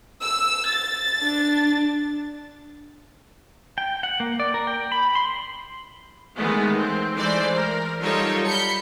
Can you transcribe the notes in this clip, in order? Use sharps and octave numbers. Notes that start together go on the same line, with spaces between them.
E6
A6
D4
G5
F#5
A#3
D5
A#4
G5
B5
C6
D#3 E3 G#3 A3 B3
C4
E3 G#3 A3 C5 D5
A#4
F#3 G3 D#4 F4 A4 C#5
B5 G6 C#7